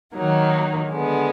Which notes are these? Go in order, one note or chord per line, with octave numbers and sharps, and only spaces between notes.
D#3 F#3 A#3 D#4
D3 G#3 B3